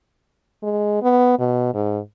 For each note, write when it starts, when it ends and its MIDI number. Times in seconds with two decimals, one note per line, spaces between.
0.63 1.02 56
1.02 1.35 59
1.39 1.73 47
1.74 1.99 44